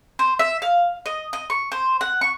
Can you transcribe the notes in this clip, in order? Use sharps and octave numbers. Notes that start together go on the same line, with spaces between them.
C5
E5
F5
D#5
D#5
C#6
C5
F#5
C#6